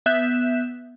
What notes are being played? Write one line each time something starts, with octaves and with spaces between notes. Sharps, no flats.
B3 E5 F#6 G6 B6 E7